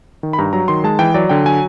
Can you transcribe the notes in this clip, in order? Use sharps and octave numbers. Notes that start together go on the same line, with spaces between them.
D#3
B5
G2 A#5
F#3 A#5
D#3 C6
G#3 A5
E3 G5
F#3 D5
D3 G5
F#3 G#5